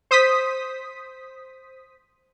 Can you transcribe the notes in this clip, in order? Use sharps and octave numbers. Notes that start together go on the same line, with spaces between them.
C5 D#6 B6